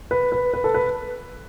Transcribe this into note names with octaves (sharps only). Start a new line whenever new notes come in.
B4
B4
B4
A4
B4